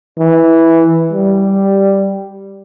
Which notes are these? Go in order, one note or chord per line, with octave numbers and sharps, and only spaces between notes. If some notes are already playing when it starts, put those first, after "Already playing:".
E3
G3